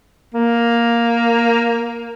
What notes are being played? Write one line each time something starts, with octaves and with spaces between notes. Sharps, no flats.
A#3